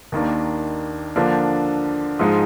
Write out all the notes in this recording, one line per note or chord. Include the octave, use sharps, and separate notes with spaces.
D#2 D#3 A#3 D4
D3 F3 A#3 D4
G#2 F3 G#3 D#4